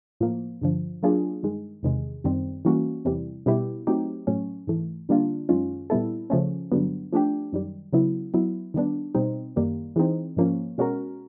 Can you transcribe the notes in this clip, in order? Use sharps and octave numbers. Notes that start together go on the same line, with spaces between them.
A2 F3 A#3
G2 D3 F3
F#3 A#3 D4 F4 G#4
G2 D#3 G#3
E2 C3 D#3 G#3
F#2 D#3 G3 C4
E3 G3 A#3 C#4 F#4
E2 C3 E3 G3
B2 G3 B3 E4 G4
F#3 A3 C4 D#4 G4
A2 F#3 A3 C#4
G#2 E3 A3
D3 G3 A#3 D4 F4
F#2 D#3 G#3 C#4 F4
A#2 G3 B3 E4 A4
C#3 F3 A3 C#4
G2 D3 F#3 B3
F3 A3 D4 G4
F#2 D#3 G3
C#3 F#3 B3 E4
F#3 B3 E4
D#3 G3 B3 D4
B2 G3 C4 D#4
F#2 D#3 G3 A#3
E3 G#3 C4 D#4
G#2 F3 A#3 C#4
B2 G#3 C#4 F#4 A#4